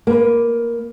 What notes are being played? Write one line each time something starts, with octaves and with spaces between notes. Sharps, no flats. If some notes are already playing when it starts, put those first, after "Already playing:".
A#3 B4